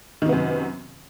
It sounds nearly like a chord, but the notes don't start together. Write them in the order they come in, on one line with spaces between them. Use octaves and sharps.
D#3 C3 B3 F#2